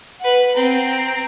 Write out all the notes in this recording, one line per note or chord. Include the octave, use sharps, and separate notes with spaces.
B4 F#5
C4 A#5